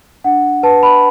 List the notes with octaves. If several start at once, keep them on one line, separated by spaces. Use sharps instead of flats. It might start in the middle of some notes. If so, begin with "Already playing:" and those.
D4 F#5
B4 A5
B5